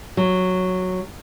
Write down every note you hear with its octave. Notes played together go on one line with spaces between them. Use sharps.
F#3